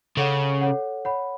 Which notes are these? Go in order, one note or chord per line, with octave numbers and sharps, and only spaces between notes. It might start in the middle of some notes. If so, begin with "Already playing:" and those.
C#3 A4 C#5 F#5
A4 C#5 F#5
C#5 F#5 B5